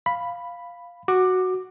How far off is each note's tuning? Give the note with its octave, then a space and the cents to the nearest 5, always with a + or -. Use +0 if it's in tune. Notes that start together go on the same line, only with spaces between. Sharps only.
F5 +0 B5 +0
F#4 +0 D6 +15